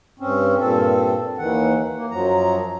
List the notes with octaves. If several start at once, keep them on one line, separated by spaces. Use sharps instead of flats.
G2 C4 C#4
G2 A#2 C4 A4
D#2 D#3 E3 F#5
A#3
F#2 F3 F#3 A#5